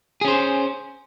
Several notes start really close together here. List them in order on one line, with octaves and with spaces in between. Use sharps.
G#4 C#4 C5